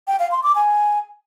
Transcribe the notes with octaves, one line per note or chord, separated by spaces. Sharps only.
G5
F5
C6
D6
G#5